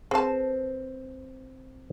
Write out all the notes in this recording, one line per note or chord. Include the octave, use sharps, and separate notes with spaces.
C4 G#4 B4 A5